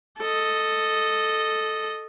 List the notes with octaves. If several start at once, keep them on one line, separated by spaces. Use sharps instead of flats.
A4 D#5